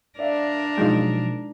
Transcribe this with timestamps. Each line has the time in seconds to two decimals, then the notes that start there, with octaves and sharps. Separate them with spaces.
0.19 D4 A#4 D5 E5 F5
0.78 B2 F3 F#3 G#3 D#4 F4